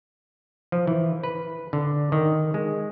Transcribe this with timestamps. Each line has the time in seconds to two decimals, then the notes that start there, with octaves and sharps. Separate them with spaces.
0.72 F3
0.87 E3
1.24 B4
1.73 D3
2.12 D#3
2.54 G#3